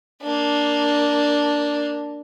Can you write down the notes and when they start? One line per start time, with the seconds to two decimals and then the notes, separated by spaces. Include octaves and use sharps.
0.22 A#3 D4